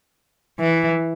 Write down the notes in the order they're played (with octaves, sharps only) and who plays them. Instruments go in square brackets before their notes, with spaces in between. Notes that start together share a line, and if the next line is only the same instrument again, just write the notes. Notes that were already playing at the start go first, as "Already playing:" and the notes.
[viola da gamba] E3